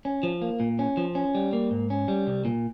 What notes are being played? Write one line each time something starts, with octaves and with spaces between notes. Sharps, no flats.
C#4
F3
A#3
A#2
C#4
F3
C#4
G3
A#3
G#2
C#4
G3
C2
A#2